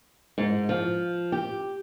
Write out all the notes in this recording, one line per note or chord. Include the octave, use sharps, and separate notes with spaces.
G#2
F3
G4